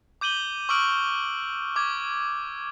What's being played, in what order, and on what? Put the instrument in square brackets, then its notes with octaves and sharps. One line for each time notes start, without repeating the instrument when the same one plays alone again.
[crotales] D6 G6 D#7 F#7 G7
C#6 D6 E6 F6 D7 F#7
C#6 D6 G#6